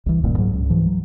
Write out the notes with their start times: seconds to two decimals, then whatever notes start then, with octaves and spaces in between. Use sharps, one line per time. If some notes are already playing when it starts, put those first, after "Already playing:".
0.06 C2 E3
0.24 F1 C#2 G2 A#2
0.38 G#2 F#3
0.53 C#2
0.70 G#2 E3 F3
0.86 F#3